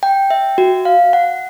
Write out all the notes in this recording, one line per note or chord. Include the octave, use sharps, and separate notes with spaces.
G5
E5
F#4
F5
F#5